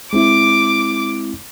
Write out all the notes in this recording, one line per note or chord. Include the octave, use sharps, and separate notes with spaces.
G#3 C4 E4 D6